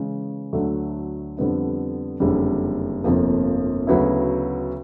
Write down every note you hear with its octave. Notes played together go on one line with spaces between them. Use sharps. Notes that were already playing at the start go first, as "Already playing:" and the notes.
Already playing: C#3 E3 G#3
D2 D3 F#3 A3
F2 D3 G3 B3 E4
F#1 F2 D3 G3
G1 F2 C3 F3 A#3
D2 C#3 F#3 B3 E4